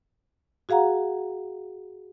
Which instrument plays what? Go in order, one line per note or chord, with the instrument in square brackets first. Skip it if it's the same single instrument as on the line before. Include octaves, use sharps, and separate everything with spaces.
[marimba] F#4 G#4 F5 F#5 A#5